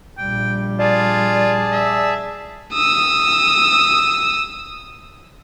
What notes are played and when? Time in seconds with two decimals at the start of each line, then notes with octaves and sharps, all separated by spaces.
0.18 A#1 G3 G5
0.79 F4 G#4 D5 A5
1.72 E5
2.74 D#6 E6